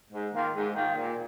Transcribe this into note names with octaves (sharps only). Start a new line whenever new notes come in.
G#2
D#3 A#3 F4
G#2
D#3 A#3 F4
A#2